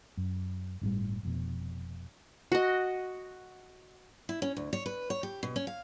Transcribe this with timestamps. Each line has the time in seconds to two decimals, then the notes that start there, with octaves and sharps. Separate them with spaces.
0.17 F#2
0.81 G1 A2 C3 G3
1.23 F1 F2 B2
2.52 F#4 D#5
4.29 E4
4.42 C#4
4.57 D2
4.73 C#5
4.86 B4
5.10 C#5
5.23 G4
5.43 B2
5.56 C#4
5.67 F5